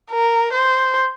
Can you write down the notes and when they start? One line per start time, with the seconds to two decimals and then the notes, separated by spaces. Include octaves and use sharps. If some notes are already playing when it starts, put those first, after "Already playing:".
0.10 A#4
0.53 C5